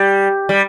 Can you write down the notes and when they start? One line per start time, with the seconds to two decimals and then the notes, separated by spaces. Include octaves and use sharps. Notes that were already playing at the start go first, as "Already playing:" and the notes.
Already playing: G3
0.49 G3